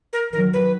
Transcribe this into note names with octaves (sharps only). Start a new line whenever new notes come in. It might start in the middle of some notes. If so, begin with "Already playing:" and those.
A#4
D#3 F#3 A#4
B4